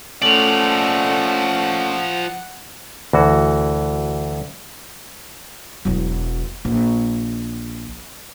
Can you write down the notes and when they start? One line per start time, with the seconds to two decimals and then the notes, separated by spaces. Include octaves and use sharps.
0.22 F3 A3 C#4 D5 F#5 F7 F#7
3.13 D2 E3 F#4
5.85 E1 F#3
6.65 A#1